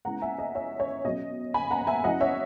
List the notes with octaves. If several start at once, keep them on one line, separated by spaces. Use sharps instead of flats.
C#3 G#3 B3 E4 F#5 A#5
E5 G#5
D#5
C#5 E5
C#5
B2 F#3 C#4 D#5
G#5 B5
F#5 A#5
E5 G#5
F#3 C#4 E4 D#5 F#5
C#5 E5